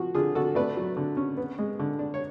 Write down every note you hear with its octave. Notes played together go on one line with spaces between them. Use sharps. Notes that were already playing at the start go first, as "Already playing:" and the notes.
Already playing: F3 F#4
D3 F4 G#4
D3 F#4 A4
A3 B4 D5
F#3
D3
C#4
B3
G#3
D3
D4
C#5